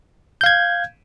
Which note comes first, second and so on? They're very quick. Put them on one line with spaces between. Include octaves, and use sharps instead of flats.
G6 F5 G#6